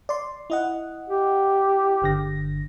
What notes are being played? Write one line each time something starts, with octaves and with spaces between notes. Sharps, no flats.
D5 C6
E4 D#5 F#5
G4
G1 D3 A#6